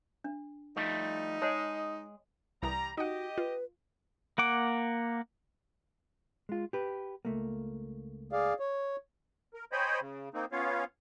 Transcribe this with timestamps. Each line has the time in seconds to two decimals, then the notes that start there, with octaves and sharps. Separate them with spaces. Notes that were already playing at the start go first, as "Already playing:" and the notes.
0.24 D4
0.76 F3 G3 A3 D#4
1.42 G#3 G#4 C#5 D#5 A5
2.63 C2 E3 G3 A#5 D#6
2.98 D#4 F#4 G4 D#5 F#5
3.38 F4 B4
4.38 A#3 F#5 D6
6.49 G#3 F4
6.73 G4 B4
7.25 C#2 A3 A#3
8.32 G#4 D5 F5
8.60 C#5
9.54 A#4
9.72 C5 C#5 D#5 G5 G#5 B5
10.01 C#3
10.34 A#3 C4 D#4
10.52 B3 C#4 F4 C#5 F5